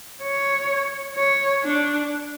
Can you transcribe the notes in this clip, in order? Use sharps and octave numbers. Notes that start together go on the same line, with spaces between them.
C#5
C#5
D4